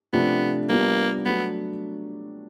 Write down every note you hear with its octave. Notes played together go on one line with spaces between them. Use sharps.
C3 F3 A3 B3 D4 F4
G3 A#3 B3 D4 F4
F#3 A3 B3 D4